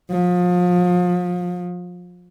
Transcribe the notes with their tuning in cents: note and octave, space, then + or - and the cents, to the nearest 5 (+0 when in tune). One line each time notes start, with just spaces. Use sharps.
F3 +30